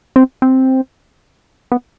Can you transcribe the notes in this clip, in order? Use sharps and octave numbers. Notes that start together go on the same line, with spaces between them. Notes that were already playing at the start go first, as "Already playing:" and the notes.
C4
C4
B3